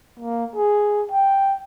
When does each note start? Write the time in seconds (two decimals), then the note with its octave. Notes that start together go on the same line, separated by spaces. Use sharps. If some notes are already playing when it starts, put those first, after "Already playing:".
0.20 A#3
0.56 G#4
1.12 G5